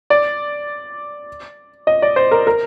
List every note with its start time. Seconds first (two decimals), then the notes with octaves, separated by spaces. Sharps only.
0.10 D5
1.87 D#5
2.02 D5
2.16 C5
2.31 A#4
2.47 A#4